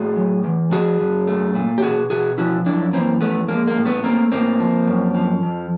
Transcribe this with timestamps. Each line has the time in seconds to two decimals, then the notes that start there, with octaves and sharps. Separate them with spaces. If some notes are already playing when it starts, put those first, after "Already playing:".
Already playing: A2 A3 F#4 G#4
0.16 F#3
0.44 E2
0.72 F3 F#4 G#4
1.00 F#2
1.27 A3
1.55 A#2
1.78 G4
1.82 B2 F#4 G#4
2.10 B2 F#4 G#4
2.38 F3 E4 F#4
2.66 F#2 D4 E4
2.93 E3 A#3 C4
3.21 F2 A3 B3
3.48 G#3 A#3
3.67 A#3
3.77 A2
3.85 A3 B3
4.04 A3 A#3 C4
4.32 A2 A#3 C4
4.60 F3
4.87 F#2
5.15 F3
5.43 F2